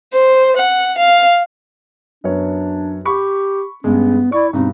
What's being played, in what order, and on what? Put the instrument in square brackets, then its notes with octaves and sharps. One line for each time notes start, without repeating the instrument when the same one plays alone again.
[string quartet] C5
F#5
F5
[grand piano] F#2 B3 C#5 [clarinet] D4
[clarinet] G4 [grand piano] B5 C#6
[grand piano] G2 G#3 [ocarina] B3 [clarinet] C#4
[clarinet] E4 [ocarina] D5 [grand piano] C#6
[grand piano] G2 B2 [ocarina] C4 [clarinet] D#4